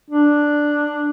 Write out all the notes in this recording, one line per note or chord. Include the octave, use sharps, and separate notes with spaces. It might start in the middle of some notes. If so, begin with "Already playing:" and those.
D4